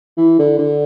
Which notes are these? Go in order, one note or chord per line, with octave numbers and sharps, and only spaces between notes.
E3
D3
D3